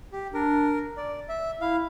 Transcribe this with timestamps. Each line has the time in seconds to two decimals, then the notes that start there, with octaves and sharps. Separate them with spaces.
0.12 G4
0.34 D4 A#4
0.97 D5
1.29 E5
1.61 E4 F5